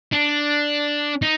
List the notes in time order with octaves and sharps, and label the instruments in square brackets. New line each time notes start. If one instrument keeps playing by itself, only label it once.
[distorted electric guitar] D4
D#4